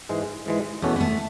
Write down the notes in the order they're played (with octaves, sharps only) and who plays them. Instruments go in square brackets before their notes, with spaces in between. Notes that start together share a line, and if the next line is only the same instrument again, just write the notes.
[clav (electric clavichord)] G#2 E3 G#3
G#2 E3 G#3
[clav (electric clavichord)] E2 B2 A3 C#4 F#4 [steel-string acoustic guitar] B3
[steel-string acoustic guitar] B3
A3